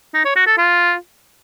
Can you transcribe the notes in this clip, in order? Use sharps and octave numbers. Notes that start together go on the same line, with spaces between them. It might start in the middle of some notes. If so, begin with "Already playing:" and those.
D#4
C#5
F#4
A4
F4